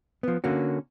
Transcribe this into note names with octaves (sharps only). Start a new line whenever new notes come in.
F3 B3
D3 A#3 C#4 F#4